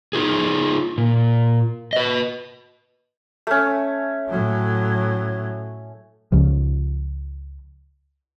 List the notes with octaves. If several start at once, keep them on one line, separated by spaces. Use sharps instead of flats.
D#4 F4 G#4
A#2
B4 D#5
A3 C#4
A2 F#3
C#2 C#3 F3